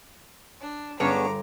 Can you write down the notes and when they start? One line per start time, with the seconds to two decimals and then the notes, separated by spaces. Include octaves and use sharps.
0.61 D4
1.00 G1 B3 C#4 D4 G#4 C#5 A#5 D6